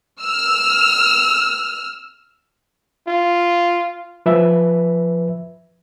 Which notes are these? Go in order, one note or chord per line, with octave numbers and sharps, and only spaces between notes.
E6 F6
F4
F3 B4 E5